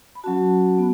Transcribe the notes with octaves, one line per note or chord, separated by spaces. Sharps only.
B5
F#3 C#4 F#4 A5
B3